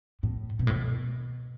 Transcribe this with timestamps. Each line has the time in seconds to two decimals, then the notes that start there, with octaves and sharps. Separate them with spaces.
0.23 A2
0.59 B2
0.67 A2
0.76 B2